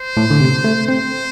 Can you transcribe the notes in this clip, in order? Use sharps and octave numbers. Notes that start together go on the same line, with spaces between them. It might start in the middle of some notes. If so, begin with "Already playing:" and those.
Already playing: C5
A2
D3
C3
A3
C4 C5